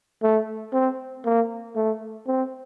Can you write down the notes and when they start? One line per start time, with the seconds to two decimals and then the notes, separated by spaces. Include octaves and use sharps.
0.23 A3
0.73 C4
1.25 A#3
1.76 A3
2.27 C4